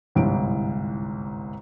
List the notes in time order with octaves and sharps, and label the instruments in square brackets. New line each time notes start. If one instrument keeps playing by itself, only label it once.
[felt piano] G1 C2 G#2 E4 D7